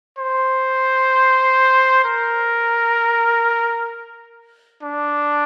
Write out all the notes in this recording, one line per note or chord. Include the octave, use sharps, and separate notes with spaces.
C5
A#4
D4